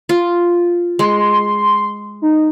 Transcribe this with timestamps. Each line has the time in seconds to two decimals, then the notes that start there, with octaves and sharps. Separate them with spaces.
0.09 F4
0.99 G#3 C6
2.22 D#4